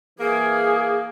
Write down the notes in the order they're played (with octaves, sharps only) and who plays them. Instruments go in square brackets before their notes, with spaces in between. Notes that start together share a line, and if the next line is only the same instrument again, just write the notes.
[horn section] E3 A#3 [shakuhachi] G#4